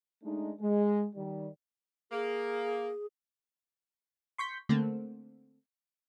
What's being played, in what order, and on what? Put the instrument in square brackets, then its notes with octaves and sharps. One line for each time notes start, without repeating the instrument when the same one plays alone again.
[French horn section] G#3 A3 D4 D#4
G#3
D#3 G3
[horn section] A#3 [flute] G#4
[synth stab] C6 C#6 G6 B6
D3 A3 A#3 C4